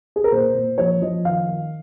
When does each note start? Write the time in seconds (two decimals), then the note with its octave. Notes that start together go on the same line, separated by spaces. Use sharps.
0.16 G#4
0.24 A#4
0.32 A#2 C5
0.55 A#2
0.78 F3 C#5
1.02 F3 D#5
1.25 D#3 F5
1.49 D#3